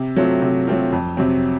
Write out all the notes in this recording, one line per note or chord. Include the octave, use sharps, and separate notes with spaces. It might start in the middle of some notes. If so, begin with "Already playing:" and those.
Already playing: C3
F#3 A3 C4 F4
C3
F#3 A3 C4 F4
F2
C3 F#3 C4